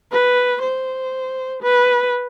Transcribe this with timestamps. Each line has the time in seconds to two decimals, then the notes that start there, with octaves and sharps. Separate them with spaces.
0.12 B4
0.63 C5
1.63 B4